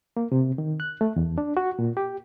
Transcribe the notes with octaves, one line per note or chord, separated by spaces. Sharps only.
A#3
C3
D#3
F#6
A3
E2
D4
F#4
A#2
G4